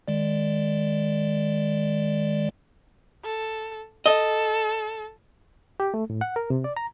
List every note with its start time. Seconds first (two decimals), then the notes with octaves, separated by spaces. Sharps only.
0.08 D#3 G#3 D5
3.24 A4
4.06 A4 D#5
5.80 G4
5.94 A3
6.10 A2
6.21 F#5
6.36 A#4
6.50 C3
6.64 D5
6.77 A#5